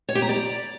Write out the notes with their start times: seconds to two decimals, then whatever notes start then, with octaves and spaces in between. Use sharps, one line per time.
0.09 C#5
0.15 G4
0.22 A#5
0.29 D5